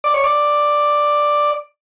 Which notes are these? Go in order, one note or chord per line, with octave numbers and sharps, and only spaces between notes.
D5
C#5
D5